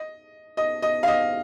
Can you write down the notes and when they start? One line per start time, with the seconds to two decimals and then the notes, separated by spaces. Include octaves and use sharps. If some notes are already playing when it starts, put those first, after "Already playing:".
Already playing: D#5
0.57 D#5
0.82 D#5
1.03 F5
1.08 D#5